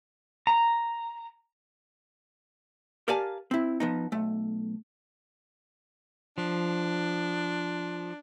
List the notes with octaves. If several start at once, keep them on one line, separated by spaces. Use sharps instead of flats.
A#5
G4 A#4 D5 F5 G#5 A5
C4 E4
F3 B3 D#4
B1 A3
F3 D4